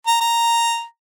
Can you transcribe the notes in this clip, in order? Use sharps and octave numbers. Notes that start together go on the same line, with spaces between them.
A#5
A#5